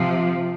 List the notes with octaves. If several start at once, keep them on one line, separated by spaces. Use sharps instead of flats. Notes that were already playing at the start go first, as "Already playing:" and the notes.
Already playing: C3 F3